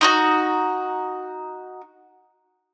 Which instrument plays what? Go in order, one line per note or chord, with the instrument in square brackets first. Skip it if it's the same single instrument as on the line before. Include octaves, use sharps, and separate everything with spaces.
[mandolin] D#4 E4 F#4